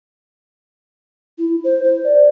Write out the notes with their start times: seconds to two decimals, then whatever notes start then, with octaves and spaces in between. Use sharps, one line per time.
1.38 E4
1.64 C5
1.84 C5
2.04 D5